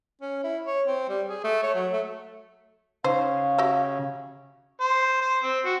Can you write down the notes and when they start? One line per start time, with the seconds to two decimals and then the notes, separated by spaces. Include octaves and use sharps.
0.21 C#4
0.44 E4
0.67 C#5
0.87 C4
1.09 G3
1.29 G#4
1.44 A3
1.63 C#5
1.75 F#3
1.93 A3
3.04 C#3 D#4 C5 F5
3.58 F#4 G4 E5
4.81 C5
5.21 C5
5.43 C4
5.65 F#4